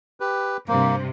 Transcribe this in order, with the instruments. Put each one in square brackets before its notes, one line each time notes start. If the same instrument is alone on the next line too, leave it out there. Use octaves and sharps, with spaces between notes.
[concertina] G4 B4
[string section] G2 C3 [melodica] A#3 [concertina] C5